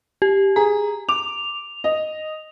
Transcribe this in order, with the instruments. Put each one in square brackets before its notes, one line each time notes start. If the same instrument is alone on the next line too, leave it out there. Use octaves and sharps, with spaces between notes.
[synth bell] G4
[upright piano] G#4 [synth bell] A#5
[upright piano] D6 [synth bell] F7
[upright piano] D#5